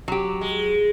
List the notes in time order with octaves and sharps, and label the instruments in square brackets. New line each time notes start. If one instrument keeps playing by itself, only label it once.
[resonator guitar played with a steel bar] F#3 G4
[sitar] G#3